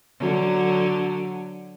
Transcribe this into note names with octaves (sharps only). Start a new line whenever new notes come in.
D3 F#3